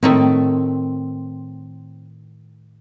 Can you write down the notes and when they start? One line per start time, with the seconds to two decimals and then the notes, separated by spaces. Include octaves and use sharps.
0.03 A2 D#3 A3 C4